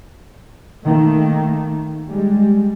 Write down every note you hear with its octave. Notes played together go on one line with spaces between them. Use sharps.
D#3 A3 A#3
G3 G#3